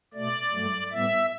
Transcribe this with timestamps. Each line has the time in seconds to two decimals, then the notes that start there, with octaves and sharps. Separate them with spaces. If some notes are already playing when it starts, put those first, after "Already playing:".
0.14 B2 A3 D5
0.53 G2 F#3 A3
0.91 A2 G3 B3 E5